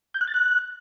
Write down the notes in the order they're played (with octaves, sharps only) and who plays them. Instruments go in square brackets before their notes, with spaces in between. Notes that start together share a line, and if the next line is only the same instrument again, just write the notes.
[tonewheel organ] G6
F#6
A6
F#6